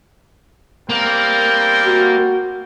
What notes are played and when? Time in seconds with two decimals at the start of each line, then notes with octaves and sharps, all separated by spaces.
0.89 G3 A#3 C4 A#4 G6
1.84 F#4